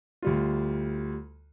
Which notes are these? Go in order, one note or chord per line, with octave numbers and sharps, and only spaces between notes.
D2 G3 F4